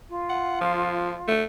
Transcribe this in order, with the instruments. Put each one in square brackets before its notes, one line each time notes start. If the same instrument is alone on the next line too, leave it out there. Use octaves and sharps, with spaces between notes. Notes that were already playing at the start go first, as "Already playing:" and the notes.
[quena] F4
[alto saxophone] F#5
F3
A3